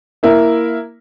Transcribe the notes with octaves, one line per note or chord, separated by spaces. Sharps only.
A#3 E4 A#4